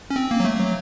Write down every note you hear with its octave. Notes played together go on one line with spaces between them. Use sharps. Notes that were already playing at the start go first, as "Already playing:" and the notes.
C#4
C4
A#3
F#3
A3
F#3